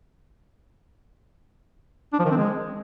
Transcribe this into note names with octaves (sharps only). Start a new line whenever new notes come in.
D4
F3
D#3
C4
G#3